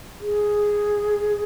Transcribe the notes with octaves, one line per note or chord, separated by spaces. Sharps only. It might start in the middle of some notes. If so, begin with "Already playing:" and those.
G#4